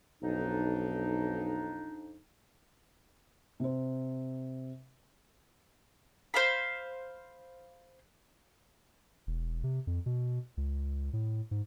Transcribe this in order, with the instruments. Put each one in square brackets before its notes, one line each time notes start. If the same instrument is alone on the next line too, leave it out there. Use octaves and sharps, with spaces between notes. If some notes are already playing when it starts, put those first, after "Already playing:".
[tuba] B1 [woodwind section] F2 D4 D#4
[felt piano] C3 C5
[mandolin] C5 F5 B5
[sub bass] E1
C3
F2
B2
C#2
A2
G#2